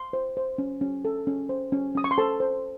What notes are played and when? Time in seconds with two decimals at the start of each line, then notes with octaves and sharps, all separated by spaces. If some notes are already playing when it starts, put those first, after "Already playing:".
Already playing: C6
0.13 C5
0.37 C5
0.58 C#4
0.81 C#4
1.05 A4
1.27 C#4
1.49 C5
1.72 C#4
1.95 C#4 D#6
2.04 C#6
2.11 C6
2.18 A4 C5 A5
2.40 C5